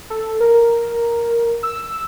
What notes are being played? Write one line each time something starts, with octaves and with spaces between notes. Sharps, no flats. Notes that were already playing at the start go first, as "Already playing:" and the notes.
A4
A#4
E6